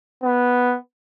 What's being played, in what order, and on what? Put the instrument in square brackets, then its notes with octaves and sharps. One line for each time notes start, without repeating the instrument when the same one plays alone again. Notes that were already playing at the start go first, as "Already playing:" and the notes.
[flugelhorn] B3